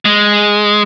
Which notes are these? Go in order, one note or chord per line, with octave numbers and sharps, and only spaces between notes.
G#3